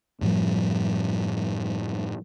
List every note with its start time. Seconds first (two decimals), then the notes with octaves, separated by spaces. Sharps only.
0.21 F#2 A2 F3 G3